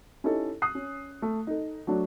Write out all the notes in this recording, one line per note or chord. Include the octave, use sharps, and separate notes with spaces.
C#4 D#4 E4 G4 A4
D#6 F#6 C7
C#4
A3
D#4 A4
F#3 A3 D4 F#4